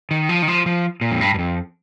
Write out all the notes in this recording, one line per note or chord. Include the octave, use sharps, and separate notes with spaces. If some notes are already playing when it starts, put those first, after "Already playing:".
D#3
F3
D#3
F3
F3
A#2
F2
G2
G2
F2